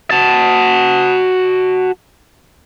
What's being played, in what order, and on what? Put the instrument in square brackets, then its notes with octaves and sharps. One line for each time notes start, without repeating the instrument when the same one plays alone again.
[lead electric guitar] F#4 A5